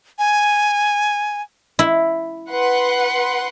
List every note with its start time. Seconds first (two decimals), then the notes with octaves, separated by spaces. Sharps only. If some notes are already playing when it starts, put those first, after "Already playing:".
0.19 G#5
1.79 E4
2.51 B4 F#5 C6